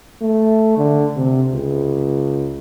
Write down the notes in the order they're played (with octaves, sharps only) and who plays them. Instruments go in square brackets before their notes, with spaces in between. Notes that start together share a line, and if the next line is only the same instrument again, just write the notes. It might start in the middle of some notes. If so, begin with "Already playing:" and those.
[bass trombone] A3
D3
C3
C#2